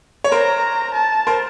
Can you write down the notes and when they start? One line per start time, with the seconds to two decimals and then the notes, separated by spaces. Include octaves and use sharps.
0.24 C#5
0.32 A#4 C5 A#5
0.94 A5
1.27 A#4 C5